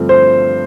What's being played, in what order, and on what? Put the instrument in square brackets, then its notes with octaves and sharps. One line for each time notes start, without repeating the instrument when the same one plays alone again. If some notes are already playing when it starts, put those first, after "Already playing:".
Already playing: [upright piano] G2 D3 F3 A3 C4
[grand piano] C5